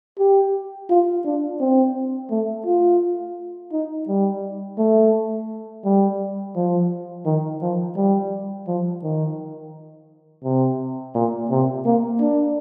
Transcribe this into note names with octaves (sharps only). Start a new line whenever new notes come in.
G4
F4
D4
C4
A3
F4
D#4
G3
A3
G3
F3
D#3
F3
G3
F3
D#3
C3
A#2
C3
A#3
D4